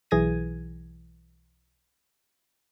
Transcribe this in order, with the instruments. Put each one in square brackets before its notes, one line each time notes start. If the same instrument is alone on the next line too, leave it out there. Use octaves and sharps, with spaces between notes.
[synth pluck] B1 E3 G#4 G#6 A#6 D#7